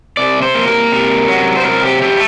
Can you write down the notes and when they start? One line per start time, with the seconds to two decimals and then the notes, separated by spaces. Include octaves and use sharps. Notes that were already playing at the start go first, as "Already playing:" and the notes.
0.17 C3 D5
0.42 C5
0.55 A#3
0.68 A#4
0.92 C3
1.28 F#3
1.56 C5
1.65 C3 A#4
1.83 G4
2.02 A3 G4